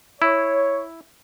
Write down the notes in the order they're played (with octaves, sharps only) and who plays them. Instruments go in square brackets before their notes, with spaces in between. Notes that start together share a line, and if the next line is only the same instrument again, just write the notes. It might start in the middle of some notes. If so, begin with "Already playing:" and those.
[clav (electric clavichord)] E4 [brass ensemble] C#5